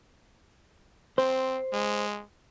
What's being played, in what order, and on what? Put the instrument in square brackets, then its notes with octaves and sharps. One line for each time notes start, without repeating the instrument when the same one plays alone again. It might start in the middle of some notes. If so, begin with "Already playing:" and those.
[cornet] C4 [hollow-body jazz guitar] C5
[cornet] G#3